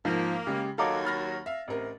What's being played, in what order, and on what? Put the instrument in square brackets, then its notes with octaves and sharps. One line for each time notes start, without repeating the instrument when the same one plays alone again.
[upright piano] G#2 [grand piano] F3 [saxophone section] A#3
[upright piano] C#3 G#3 [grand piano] G4
[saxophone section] D#2 F#3 [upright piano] A4 D#5 F#5 [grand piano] F5 A#5 D6
[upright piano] B5 F6 A#6 [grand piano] A6
[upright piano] E5 F5
[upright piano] A1 A#4 [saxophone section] C3